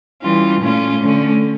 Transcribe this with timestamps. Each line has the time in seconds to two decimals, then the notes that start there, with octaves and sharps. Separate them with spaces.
0.22 E3 G3 C#4 F4
0.61 A#2 A3 C#4 F4
1.01 D3 A3 C#4